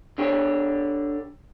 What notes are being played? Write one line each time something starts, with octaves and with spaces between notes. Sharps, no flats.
D3 D4 G4 C#5